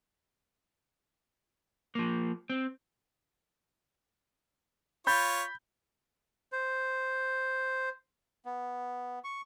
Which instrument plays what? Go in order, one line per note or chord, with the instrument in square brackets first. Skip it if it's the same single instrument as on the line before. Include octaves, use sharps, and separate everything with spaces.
[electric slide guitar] F3 A#3
C4
[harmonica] F4 C#5 [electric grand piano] B5 G6 A6
[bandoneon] C5
B3
C#6